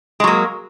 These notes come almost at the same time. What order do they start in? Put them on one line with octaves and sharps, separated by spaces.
G#3 F#3 A#3